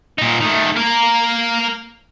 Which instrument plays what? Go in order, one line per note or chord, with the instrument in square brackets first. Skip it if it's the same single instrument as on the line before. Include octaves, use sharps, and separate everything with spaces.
[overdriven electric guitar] A#2 D#4
D#3 A3
A#3 A#4